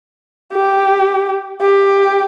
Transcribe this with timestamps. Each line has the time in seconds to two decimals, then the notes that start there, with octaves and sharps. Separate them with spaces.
0.53 G4
1.61 G4